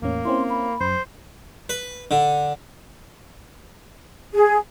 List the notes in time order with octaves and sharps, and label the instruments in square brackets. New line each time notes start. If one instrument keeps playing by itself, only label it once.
[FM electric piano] E2 A2 C#4 [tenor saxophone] A#3
[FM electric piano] C4 C#4 E4 [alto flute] C6
[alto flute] B5
[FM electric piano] F#2 [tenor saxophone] C5
[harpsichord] B4
D3
[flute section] G#4